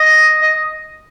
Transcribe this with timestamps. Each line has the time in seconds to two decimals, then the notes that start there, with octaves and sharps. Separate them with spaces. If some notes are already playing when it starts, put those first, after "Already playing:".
Already playing: D#5
0.42 D#5